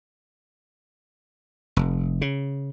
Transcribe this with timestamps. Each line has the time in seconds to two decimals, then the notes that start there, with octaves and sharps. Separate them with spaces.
1.77 F1
2.21 C#3